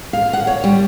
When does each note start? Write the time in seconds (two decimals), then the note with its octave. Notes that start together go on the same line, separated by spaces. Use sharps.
0.13 F5
0.33 F#5
0.47 C#5
0.64 G3